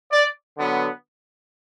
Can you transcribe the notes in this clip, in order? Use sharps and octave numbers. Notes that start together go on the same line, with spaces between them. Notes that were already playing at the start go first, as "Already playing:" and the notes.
D5
D3 F#3 B3